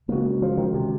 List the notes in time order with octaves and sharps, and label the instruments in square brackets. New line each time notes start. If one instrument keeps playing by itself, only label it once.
[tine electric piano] C#3 G#3 C#4 F#4 [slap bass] A#3
[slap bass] F3
D#3
C3